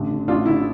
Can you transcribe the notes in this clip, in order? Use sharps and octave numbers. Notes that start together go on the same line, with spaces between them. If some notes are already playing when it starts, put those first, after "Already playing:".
Already playing: A1 D3
D3
A1 D4 F4
D3 E4